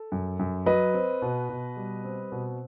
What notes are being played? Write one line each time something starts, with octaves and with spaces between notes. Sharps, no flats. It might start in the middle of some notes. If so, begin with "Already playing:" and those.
Already playing: A4
F#2
F#2
F#3 B4 D#5
C4
B2
B2
G3
C4
B2